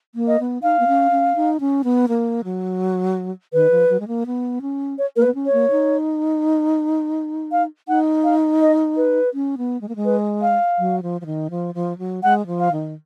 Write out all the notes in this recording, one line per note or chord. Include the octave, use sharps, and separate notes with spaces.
A#3
D#5
B3
D#4 F5
B3
C#4
C#4
D#4
C#4
B3
A#3
F#3
D#3 B4
F3
F#3
G#3
A#3
B3
C#4
C#5
A#3 A#4
B4
B3
C#4
C#5
A#3
D#4
F5
D#4 F#5
F5
D#5
B4
C#4
B3
G#3
A#3
G#3
B4
F5
F#3
F3
F3
D#3
F3
F3
F#3
G#3 F#5
F3
F5
D#3